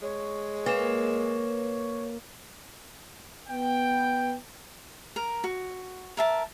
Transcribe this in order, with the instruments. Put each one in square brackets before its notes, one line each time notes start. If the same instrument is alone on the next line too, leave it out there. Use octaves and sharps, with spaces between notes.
[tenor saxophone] G#3 [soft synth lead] C#5
[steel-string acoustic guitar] A#3 [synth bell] B4 E7
[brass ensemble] B3 G5
[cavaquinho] A#4
F#4
A#4 E5 A5